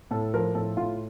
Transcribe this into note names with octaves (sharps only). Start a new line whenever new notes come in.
A2 A4
F3 A#4
A2 A4
A2 F4